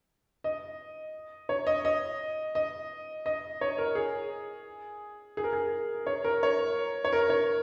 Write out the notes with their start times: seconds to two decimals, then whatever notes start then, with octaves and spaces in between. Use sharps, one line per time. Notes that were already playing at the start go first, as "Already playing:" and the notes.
0.44 D#5
1.49 C#5
1.67 D#5
1.85 D#5
2.55 D#5
3.26 D#5
3.61 C#5
3.78 A#4
3.95 G#4
5.37 G#4
5.44 A#4
5.53 G#4
6.06 C#5
6.24 A#4
6.43 C#5
7.04 C#5
7.13 A#4
7.30 C#5